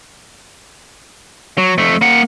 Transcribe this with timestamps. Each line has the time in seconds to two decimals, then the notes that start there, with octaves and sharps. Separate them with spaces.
1.58 F#3
1.78 F2 A3
2.01 A#3 F#5